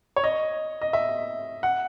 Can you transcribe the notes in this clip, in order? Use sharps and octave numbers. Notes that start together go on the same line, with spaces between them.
C#5
D#5
D#5
E5
F#5